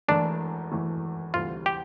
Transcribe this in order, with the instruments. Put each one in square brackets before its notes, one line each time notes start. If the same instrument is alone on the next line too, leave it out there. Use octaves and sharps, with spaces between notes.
[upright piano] E1 E2 E3 A3 [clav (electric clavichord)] D4
[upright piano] E1 E2 E3 A3
[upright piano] D2 C3 E3 G3 [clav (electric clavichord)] F4
[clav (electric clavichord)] G4